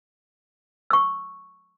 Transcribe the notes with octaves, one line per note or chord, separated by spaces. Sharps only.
C#6 E6